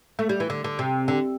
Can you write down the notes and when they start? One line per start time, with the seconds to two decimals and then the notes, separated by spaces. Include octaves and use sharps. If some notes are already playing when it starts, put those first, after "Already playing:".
0.19 A3
0.29 G3
0.40 E3
0.50 D3
0.64 D3
0.79 C3
1.08 D3